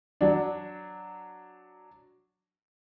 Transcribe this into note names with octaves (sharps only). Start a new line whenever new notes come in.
F#3 D4